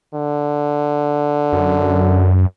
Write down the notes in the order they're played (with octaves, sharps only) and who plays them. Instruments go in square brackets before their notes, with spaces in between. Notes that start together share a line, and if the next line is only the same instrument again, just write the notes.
[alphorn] D3
[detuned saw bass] F#2